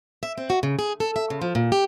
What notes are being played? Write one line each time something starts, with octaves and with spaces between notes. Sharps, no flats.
E5
C4
F#4
C#3
G#4
A4
E5
C#3
F3
A#2
G4